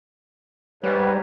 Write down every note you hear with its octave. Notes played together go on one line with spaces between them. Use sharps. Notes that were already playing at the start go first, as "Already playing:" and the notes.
G#2 G3 B4 C#5